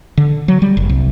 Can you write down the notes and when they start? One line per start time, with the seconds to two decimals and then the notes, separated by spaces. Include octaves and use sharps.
0.17 D3
0.48 F#3
0.62 G3
0.77 F#1
0.89 C2